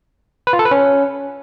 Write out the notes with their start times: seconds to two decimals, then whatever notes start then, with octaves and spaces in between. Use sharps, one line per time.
0.47 B4
0.53 F4
0.59 A4
0.65 B4
0.71 C#4